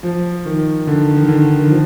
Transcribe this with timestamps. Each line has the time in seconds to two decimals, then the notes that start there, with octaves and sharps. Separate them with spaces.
0.03 F3
0.46 D#3
0.87 D3
1.17 D#3
1.28 D3
1.59 D#3
1.71 F3